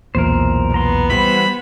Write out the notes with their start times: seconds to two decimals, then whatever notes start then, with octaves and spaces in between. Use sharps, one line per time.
0.15 B1 E2 A#2 A#4 C5
0.74 B3 A#5 C6
1.10 E3 G3 C5 B5